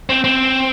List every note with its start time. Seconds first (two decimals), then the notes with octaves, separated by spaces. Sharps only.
0.09 C4
0.24 C4